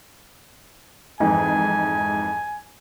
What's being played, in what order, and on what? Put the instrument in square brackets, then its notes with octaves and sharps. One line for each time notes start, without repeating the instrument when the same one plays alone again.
[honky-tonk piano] F2 G#2 E3 [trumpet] G#5